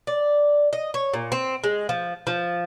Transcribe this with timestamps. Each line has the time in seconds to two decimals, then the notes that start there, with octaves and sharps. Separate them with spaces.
0.07 D5
0.73 D#5
0.94 C#5
1.14 A#2
1.32 C4
1.64 G#3
1.89 F3
2.27 F3